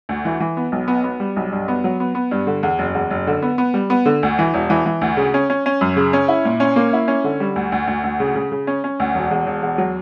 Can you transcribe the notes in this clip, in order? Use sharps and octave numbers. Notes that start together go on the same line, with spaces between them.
D2
E3
E3
B3
B1
B3
B3
G3
B1
G2
B3
F#3
B3
B3
G2
D3
E2
F#1
E2
F#1
D3
B3
B3
G3
B3
D3
D2
E3
E1
E3
E3
D2
C#3
C#4
C#4
C#4
F#2
C#3
C#4
E4
A#2
C#4
A#3
E4
C#4
D3
G3
D2
D2
D2
D2
C#3
C#3
C#3
C#4
C#4
D2
E1
E2
E1
E2
F#3